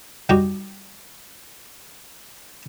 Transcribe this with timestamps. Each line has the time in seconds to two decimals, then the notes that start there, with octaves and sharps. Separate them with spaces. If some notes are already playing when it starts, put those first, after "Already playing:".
0.29 G3 D#4 F#4 G4